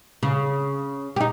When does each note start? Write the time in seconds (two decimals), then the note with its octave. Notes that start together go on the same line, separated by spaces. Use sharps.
0.23 C#3
1.16 D#4 G4